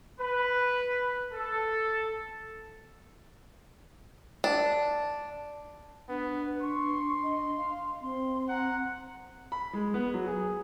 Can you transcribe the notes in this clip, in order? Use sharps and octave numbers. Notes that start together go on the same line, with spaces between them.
B4
A4
D4
B3 D4 B4
C6 C#6
D#5
F5
C4 C6
F#5 A#5
B5
G#3
B3
F#3
G#4